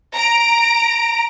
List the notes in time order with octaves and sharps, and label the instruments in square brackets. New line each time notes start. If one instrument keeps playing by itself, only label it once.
[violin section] A#5 D7